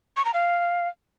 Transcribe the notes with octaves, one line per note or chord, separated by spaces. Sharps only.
C#6
A#5
F5